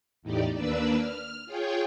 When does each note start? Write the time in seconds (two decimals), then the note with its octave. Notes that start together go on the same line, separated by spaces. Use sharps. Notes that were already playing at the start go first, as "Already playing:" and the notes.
0.22 E2 A2 D#4 G4 D5
0.54 D#2 A#3 D4 B4 D5 E6
0.97 F6
1.46 F4 G#4 C#5 G5